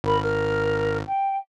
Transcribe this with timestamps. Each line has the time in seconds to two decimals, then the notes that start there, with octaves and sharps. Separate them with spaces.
0.04 G#1 A#4 B5
0.22 A#4 F6
1.06 G5